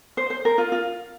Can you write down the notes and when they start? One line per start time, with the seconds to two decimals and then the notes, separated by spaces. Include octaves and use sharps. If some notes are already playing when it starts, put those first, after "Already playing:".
0.17 C5
0.30 C5
0.45 A#4
0.58 F4
0.72 F4